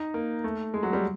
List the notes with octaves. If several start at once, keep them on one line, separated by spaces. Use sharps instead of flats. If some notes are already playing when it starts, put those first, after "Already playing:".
Already playing: D#4
A#3
A3
G#3
F#3
G3